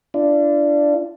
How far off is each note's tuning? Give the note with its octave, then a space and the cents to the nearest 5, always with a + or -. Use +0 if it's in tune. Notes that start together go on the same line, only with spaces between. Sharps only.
D4 +0 F4 -40